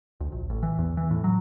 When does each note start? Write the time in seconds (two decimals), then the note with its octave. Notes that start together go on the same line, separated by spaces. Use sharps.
0.20 D2
0.32 A#1
0.50 A1
0.63 E3
0.79 E2
0.97 E3
1.11 A2
1.24 F#3